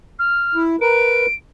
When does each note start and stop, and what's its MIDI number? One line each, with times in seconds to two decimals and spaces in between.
0.19 0.62 89
0.55 0.76 64
0.81 1.26 70
0.81 1.26 71
0.81 1.34 98